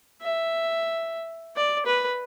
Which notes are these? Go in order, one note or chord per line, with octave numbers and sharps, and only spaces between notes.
E5
D5
B4